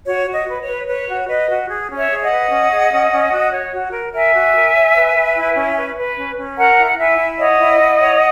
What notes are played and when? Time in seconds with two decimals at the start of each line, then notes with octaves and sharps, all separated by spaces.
0.05 F#4 C#5
0.25 F#4
0.32 D#5
0.46 B4
0.60 C#5
0.67 B4
0.87 B4 C#5
1.07 F#4
1.28 B4 D#5
1.48 F#4
1.69 G#4
1.89 C#4
1.95 C#5 E5
2.09 G#4
2.23 D#5 F#5
2.30 B4
2.50 C#4
2.70 G#4
2.91 C#4
3.11 C#4
3.31 F#4
3.52 C#5
3.72 F#4
3.93 A#4
4.13 A#4 E5 G#5
4.33 F#4
4.53 A#4
4.74 C#5
4.94 B4
5.15 B4
5.35 E4
5.55 C#4
5.76 B4
5.96 B4
6.16 C#4
6.37 C#4
6.57 A#4 F#5 A#5
6.77 E4
6.87 F#5
6.98 E4 E5 G#5
7.18 E4
7.39 C#5 D#5 F#5
7.59 E4
7.79 E4
7.99 C#5